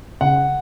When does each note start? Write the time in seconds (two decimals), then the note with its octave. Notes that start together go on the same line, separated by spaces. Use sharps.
0.21 C#3 F#5